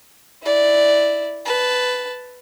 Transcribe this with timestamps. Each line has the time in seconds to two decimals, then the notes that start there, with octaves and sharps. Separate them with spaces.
0.43 E4 D5
1.46 B4 A5